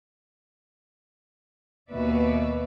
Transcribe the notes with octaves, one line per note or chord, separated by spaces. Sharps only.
D#2 B2 F#4 B4 D5 E5